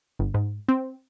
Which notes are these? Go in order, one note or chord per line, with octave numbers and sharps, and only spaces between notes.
G1
G#2
C4